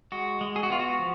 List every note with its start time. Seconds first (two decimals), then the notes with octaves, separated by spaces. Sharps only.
0.12 G#3 F#4
0.41 G#3
0.56 G#4
0.63 F#4
0.70 B3 F4
0.79 F#4
0.99 F3